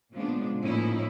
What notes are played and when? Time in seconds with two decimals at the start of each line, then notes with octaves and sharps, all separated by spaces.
0.13 A#2 C#3 F3 G#3 B3 D4
0.62 A2 F3 A#3 C#4 D#4 E4